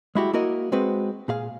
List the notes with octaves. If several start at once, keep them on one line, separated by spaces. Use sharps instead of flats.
G#3 E4 F#4 G4
A#3 E4 F#4 A#4 D#5
G#3 C4 F#4 B4
A#2 G#4 F5